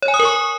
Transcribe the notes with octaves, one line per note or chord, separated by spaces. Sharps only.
C#5
G#5
D#6
A#4
C#6